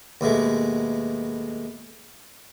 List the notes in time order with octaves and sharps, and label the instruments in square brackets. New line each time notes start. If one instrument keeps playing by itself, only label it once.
[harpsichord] D#2 B2 G#3 A3